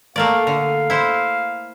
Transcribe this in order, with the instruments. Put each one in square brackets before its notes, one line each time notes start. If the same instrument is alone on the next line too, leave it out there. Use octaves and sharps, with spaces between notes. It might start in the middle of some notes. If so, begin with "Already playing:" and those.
[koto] A3 A#3 D5 [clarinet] F5
[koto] D3
E4 C5